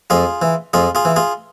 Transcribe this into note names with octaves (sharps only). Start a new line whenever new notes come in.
F2 F4 G#4
E3
F2 F4 G#4
F4 G#4
E3
F4 G#4